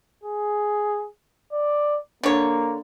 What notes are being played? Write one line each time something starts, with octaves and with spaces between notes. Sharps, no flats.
G#4
D5
D3 A#3 C#5